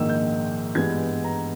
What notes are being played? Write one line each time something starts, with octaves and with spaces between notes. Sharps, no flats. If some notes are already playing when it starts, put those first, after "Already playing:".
Already playing: A#1 G#2 D#3 A#3 E6
G6
G2 E3 G#3 B3 G#6
A#5